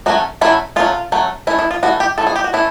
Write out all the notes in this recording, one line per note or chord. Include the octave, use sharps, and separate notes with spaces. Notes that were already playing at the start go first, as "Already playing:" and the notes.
F#3 A3 C#4 F#4
F#3 A3 C#4 E4
F#3 A3 C#4 F4
F#3 A3 C#4
E3 A3 C#4 E4
E4
F4
E3 A3 C#4 F#4
G4
E3 A3 C#4 A4
G#4
G4
F#4
E3 A3 C#4 E4